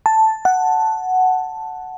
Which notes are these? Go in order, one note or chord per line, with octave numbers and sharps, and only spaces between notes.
A5
F#5